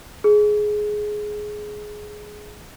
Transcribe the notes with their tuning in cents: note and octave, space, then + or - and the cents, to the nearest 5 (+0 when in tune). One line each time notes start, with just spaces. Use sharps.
G#4 +15